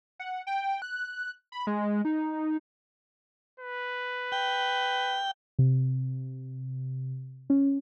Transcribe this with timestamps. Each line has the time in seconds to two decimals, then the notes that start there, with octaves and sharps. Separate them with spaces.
0.19 F#5
0.47 G5
0.82 F#6
1.52 B5
1.67 G#3
2.05 D#4
3.60 B4
4.32 G5
5.59 C3
7.50 C#4